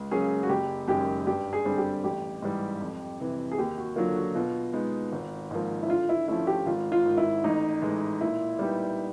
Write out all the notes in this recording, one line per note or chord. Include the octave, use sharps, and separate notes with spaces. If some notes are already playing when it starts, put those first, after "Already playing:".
Already playing: C#2
C#3 F#3 A#3 C#4 G#4
F#4
F#1 G4
F#2 D#3 G#3 C#4 G4
G2 G4
G#4
D3 G3 C4
G4
A1 G4
G#2 E3 G3
F2
C3 E3
G#4
D#2 G4
F#4
D3 F#3 A#3 F4
F#4
B2 F4
G#3 B3 D#4
G#1
G#2 F3 A#3
E4
D3 F4
E4
F3 A3 C#4 E4
G4
G#1 F4
F4
G#2 D#3
E4
A1 D#4
A2 E3 G#3
A#2 E4
G3 B3 D#4 G4